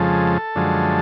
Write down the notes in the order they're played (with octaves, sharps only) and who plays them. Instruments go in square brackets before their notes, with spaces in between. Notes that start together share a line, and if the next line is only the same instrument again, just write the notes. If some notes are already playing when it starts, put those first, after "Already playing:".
Already playing: [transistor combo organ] F2 C#3 F3 G#3 A4
F#2 D3 F3 G#3